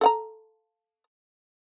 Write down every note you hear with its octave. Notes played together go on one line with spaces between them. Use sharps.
A4 F#5 A#5